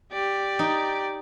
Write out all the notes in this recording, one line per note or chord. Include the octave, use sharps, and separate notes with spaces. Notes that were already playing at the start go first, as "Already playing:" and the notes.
G4 D5
D#4